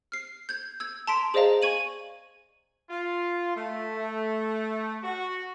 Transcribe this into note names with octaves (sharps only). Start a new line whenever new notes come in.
F6 C7
G6 G#6
E6 G#6
A5 A#5 C6 B6 D7
G#4 C5 D5 D#5 F5 A#5
G#5 C#6 G#6 D#7 F#7
F4
A3
F#4